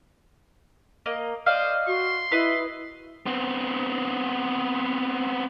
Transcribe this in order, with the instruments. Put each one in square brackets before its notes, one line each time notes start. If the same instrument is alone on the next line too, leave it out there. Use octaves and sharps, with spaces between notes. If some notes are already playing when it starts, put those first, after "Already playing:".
[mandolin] A#3 D#5
[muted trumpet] C5 [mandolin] D5 D#5 F5
[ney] F#4 [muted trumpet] C6
[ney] E4 [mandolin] B4 D#5
[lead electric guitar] B3 C4